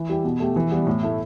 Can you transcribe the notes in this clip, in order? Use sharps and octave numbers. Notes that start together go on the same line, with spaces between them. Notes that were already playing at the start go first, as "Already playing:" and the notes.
Already playing: E3
G3 E4 G4
B2
A3 G4
E3
G3 B3
A2
A3 E4